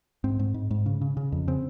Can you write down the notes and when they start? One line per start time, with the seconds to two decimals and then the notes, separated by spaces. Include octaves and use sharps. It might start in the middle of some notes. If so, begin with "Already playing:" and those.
0.24 G#2 C4
0.39 G#2
0.54 G#2
0.71 G#2
0.86 C#3
1.02 C#3
1.17 C#3
1.32 F2
1.48 C#3 C4